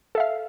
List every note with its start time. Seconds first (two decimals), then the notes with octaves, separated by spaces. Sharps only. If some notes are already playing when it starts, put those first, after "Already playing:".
0.15 A4
0.17 E5
0.20 F5